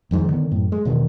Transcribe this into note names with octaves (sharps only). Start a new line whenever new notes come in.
G#1 F2 G#2 D#3
D3 D#3 B3
F#2 A2
G#3
E1 B2 D#3